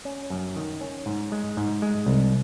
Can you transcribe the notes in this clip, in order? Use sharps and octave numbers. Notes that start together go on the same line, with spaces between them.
C#4
F#2
D#3
C#4
G#2
G#3
G#2
G#3
C2